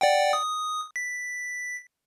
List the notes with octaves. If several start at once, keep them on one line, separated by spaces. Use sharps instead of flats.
D5 F#5 G5
D#6
B6